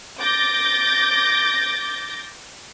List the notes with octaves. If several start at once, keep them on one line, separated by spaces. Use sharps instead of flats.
D6 G6 A6 A#6